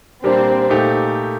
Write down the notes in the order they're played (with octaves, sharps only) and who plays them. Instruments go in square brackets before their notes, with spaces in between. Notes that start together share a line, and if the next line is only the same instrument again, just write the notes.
[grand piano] A#2 G3 A#3 D4 G4 [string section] C4
[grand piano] A#2 A3 D#4 G4